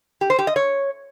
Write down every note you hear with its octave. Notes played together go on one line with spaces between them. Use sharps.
G4
C5
G4
D#5
C#5